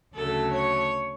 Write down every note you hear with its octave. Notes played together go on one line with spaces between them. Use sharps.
D2 C#3 F#3 A3 A4
C#5